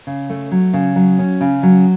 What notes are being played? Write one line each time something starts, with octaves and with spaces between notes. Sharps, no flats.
C#3
A3
F#3
C#3
F#3
C#4
C#3
F#3